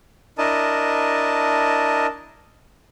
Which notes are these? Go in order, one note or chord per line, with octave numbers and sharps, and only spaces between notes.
D4 E4 A#4 D#5 A5